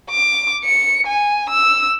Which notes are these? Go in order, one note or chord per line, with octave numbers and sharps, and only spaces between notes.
D6
C#7
G#5
E6